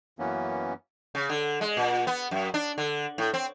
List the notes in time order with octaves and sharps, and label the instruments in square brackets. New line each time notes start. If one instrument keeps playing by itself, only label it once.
[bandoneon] F#2 E3 A#3 B3 C#4
[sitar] C#3
D3
G#3
A#2
B3
F#2
D4
D3
A2
C4